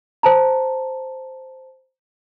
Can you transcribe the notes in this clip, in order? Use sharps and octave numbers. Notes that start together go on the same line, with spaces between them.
C5 A5 A#5